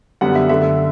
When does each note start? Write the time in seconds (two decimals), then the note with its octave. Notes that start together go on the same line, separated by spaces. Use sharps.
0.21 F#2 D3 G3 B3 F#5
0.35 E5
0.49 F#2 D3 A3 E5